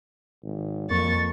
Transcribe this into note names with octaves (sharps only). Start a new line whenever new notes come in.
G#1
F2 A#3 C#6 A6